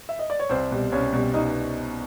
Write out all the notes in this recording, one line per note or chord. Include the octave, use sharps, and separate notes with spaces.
E5
D#5
D5
C#5
C2 C4 C5
B2 G3
C2 C#4 C#5
B2 G3
C2 D#4 D#5